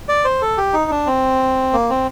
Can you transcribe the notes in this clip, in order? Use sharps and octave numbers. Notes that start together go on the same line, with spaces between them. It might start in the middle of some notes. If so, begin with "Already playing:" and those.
D5
C5
A4
G4
D#4
D4
C4
A#3
C4